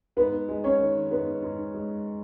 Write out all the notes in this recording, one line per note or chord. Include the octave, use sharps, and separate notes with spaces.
G#2 B3 B4
G#3
C#4 C#5
D#3
G#2 B3 B4
G#2
G#3